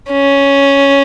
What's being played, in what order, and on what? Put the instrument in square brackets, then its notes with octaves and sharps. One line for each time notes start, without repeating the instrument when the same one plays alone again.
[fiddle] C#4